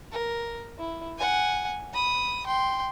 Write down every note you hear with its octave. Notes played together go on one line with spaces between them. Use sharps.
A#4
E4
F#5 G#5
B5 D#6
G5 C6